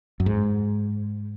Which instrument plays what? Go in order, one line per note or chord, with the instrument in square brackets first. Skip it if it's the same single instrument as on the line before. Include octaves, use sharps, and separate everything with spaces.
[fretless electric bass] F#2
G#2